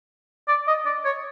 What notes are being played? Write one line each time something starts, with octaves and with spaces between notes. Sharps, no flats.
D5
D#5
D5
C#5